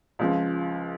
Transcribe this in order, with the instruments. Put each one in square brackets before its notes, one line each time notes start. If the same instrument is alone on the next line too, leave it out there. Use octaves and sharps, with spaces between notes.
[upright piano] C#2 C#3 F3